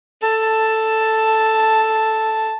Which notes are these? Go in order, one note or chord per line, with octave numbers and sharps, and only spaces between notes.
A4 A5